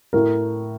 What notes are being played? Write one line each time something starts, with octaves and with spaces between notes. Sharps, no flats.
A2 A#4